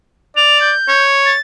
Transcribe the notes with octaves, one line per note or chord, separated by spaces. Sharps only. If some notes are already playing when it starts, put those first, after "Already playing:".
D5 F7
G6
C#5
A6